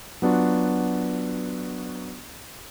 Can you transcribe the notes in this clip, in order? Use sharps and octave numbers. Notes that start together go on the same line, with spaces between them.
F#3 B3 D4 F4 F#4